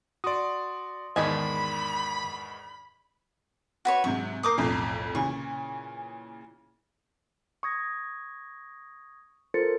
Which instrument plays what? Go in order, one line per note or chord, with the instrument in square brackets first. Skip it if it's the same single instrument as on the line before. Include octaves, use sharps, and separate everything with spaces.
[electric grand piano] F#4 D5 [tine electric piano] C6 D#6
[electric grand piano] E2 G#2 D#3 [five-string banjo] D4 D#5 G#5 [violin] B5
[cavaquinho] F#4 B4 C#5
[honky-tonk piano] G#2 C3 F#3 [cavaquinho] C#6
[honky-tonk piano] A#3 G6 C7 [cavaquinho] A#4 D6 D#6
[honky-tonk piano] B1 F2 A2
[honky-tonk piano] A#2 C#3 E3 [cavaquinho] C#6
[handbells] C#6 D#6 G#6 A#6
F4 A4 A#4 C5 A6 C#7